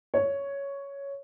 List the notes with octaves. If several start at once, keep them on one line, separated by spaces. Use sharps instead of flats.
C#5